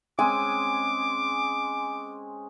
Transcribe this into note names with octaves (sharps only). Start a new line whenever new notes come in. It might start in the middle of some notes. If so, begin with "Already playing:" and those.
G#3 C4 C#4 G#5 D6